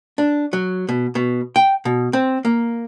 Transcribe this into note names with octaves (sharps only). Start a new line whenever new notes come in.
D4
F#3
B2
B2
G5
B2
C4
A#3